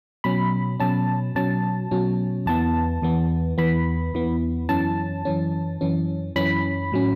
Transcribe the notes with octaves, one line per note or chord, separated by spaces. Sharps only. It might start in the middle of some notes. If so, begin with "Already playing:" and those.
B2 F#3 C#4 B5
B2 F#3 C#4 A5
B2 F#3 C#4 A5
B2 F#3 C#4
E2 E3 B3 A5
E2 E3 B3
E2 E3 B3 B5
E2 E3 B3
F#2 E3 C#4 A5
F#2 E3 C#4
F#2 E3 C#4
F#2 E3 C#4 B5
A2 F#3 C#4